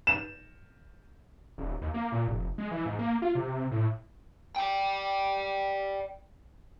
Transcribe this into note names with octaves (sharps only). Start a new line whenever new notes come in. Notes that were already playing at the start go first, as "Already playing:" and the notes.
E7
D#1
D#2
A#3
A#2
F1
G#3
E3
G#2
A#3
F4
C3
A2
D5 G5